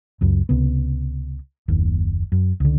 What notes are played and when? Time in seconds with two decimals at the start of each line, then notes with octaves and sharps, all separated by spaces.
0.21 C#2 F#2
0.49 C#2 C3 B3
1.68 F#1 D#2
2.32 F#2
2.60 C#2 D3